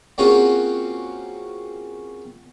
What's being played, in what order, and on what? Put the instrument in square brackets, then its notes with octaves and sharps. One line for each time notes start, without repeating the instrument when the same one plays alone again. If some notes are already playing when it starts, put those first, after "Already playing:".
[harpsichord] A#3 C4 C#4 F4 F#4 G#4